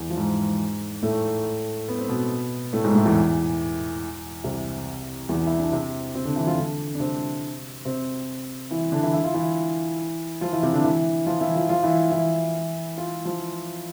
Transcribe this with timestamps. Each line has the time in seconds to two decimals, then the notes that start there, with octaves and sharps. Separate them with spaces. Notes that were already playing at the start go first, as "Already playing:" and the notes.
Already playing: E2 E3
0.10 F3
0.17 G#2 G#3
1.03 A2 A3
1.89 B3
1.99 C4
2.09 B2 B3
2.73 A2 A3
2.84 G#2 G#3
2.95 A2 A3
3.05 E2 E3
4.44 C2 C3
5.29 E2 E3
5.47 E4
5.59 D4
5.72 C3 C4
6.15 C3 C4
6.25 D3 D4
6.36 E3 E4
6.47 F3 F4
6.57 D3 D4
6.95 D4
7.00 C3 C4
7.85 C3 C4
8.71 E3 E4
8.92 D3 D4
9.03 E3 E4
9.13 E4
9.24 F4
9.34 E3 E4
10.41 F3 F4
10.53 E3 E4
10.63 C3 C4
10.73 D3 D4
10.84 E3 E4
11.26 F3 F4
11.41 E3 E4
11.55 F3 F4
11.69 F3 F4
11.83 E3 E4
12.12 E3 E4
12.98 F4
13.25 F3 F4